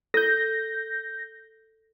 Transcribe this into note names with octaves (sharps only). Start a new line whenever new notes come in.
A4 G6 A#6